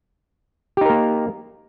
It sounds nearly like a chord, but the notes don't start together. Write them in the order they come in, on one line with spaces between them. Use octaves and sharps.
G4 D#4 A#4 A#3